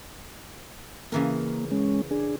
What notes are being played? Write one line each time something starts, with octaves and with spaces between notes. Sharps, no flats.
C#3 E3 A#3 A#4
G#3 C#4
D4 G#4